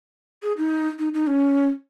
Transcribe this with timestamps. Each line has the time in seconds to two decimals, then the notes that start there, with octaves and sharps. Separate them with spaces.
0.43 G#4
0.58 D#4
0.99 D#4
1.14 D#4
1.27 C#4